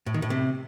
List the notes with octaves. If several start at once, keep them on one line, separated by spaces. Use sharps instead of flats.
A2
D#3
A2
C3